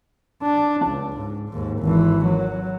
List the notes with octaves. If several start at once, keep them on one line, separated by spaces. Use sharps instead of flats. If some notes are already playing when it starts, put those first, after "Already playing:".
D4
C#2
G#2
D#2 G#2
G#1 E3
F#3